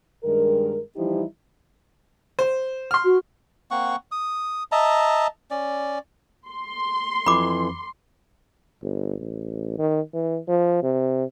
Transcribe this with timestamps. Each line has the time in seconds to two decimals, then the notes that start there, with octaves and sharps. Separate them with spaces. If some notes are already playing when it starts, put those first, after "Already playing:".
0.24 G2 D#3 G#3 A#4
0.97 E3 F3 G3 D#4 E4 G4
2.39 C5
2.91 C6 F6
3.04 F#4
3.71 A#3 C4 F#5 C#6
4.11 D#6
4.72 D#5 E5 A5 A#5
5.51 C#4 D5
6.49 C6
7.26 F2 E3 B5 D6
8.83 G1
9.20 A1
9.78 D#3
10.14 E3
10.48 F3
10.83 C3